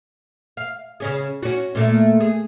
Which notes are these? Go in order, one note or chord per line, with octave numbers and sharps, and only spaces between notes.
F5
C#3 C#4 G#4
C#4 F#4
A#2 A3 A#3
G#4